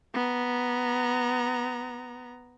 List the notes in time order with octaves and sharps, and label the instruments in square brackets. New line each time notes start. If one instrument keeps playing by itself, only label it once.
[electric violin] B3 A#5